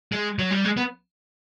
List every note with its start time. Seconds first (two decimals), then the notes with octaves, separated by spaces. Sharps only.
0.12 G#3
0.39 F#3
0.51 G3
0.65 G#3
0.77 B3